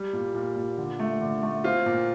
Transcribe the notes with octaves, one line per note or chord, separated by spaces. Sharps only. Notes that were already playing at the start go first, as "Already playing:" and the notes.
Already playing: G3
A#2
A#2
A#2
D3
A3
D3
A3
C4 F4
A#2